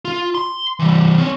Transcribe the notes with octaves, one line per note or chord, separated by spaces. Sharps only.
F4
C6
E3 G3
C4 C#5